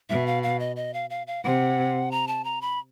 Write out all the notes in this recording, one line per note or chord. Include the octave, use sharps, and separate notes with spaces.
B2 E5
F5
F5
D#5
D#5
F5
F5
F5
C3 F#5
A#5
A5
A#5
B5